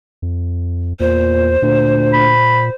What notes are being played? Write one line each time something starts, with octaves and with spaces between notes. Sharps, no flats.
F2
E2 A#2 C5
D2 A#2
B5